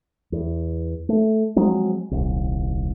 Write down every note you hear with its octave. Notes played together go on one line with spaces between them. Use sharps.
E2
A3
F3 F#3 G#3 C4
D#1 C2